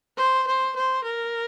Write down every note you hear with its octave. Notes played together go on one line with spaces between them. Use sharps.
C5
C5
C5
A#4